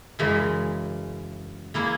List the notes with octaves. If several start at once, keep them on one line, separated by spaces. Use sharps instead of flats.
F#2 C#3 E3 G#3
E3 A#3 E4 G#4